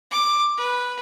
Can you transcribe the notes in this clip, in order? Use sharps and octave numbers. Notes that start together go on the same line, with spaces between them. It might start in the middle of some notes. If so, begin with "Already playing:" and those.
D6
B4